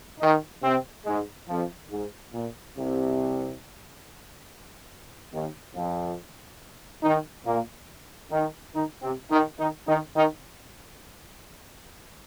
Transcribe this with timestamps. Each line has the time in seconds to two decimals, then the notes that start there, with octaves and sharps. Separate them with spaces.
0.20 D#3 D#4
0.63 C3 C4
1.06 G#2 G#3
1.49 F2 F3
1.91 G#2
2.33 A#2
2.77 C2 C3
5.33 D#2 D#3
5.75 F2 F3
7.03 D#3 D#4
7.46 A#2 A#3
8.31 D#3 D#4
8.73 D#3 D#4
9.03 C3 C4
9.31 D#3 D#4
9.59 D#3 D#4
9.87 D#3 D#4
10.16 D#3 D#4